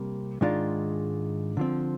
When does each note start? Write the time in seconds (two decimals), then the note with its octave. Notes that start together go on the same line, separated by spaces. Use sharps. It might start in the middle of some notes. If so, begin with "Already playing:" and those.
Already playing: C3 G3 A#3
0.41 G#2 D#3 G#3 D4 F4
1.57 D3 F3 C4